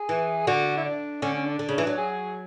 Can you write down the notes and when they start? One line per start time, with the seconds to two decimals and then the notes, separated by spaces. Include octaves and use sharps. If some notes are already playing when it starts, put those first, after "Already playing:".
Already playing: G#4
0.09 E3
0.47 D3 F#4
0.77 E4
0.84 D4
1.22 D3 C#4
1.34 C#4
1.46 D4
1.59 D3
1.69 C#3
1.78 E3
1.87 F#3
1.97 G#4